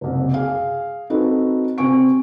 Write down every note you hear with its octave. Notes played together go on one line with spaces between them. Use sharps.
F#1 C2
G#4 F5
C4 D#4 F#4 A4 B4
C3 C4 G#5 C#6 D7